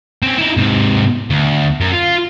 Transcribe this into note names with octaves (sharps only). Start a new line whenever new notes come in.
C4 C#4
D#4 E4
G#2 C3
D2
F#2
F4